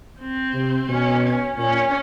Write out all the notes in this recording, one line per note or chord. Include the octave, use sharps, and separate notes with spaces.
C4
C3
B2 C#4
C#4
A#2 C#4